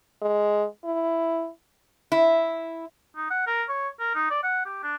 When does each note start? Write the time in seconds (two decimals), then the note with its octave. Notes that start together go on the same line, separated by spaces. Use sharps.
0.22 G#3
0.85 E4
2.12 E4
3.16 D#4
3.30 F#5
3.47 A#4
3.69 C#5
4.00 A#4
4.15 D#4
4.30 D5
4.43 F#5
4.66 G4
4.83 D4